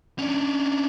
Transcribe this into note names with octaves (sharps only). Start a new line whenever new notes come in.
C#4 D4